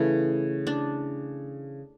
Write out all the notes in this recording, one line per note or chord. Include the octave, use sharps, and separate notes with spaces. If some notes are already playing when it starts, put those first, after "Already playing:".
Already playing: C#3 E3 A3 E4
D4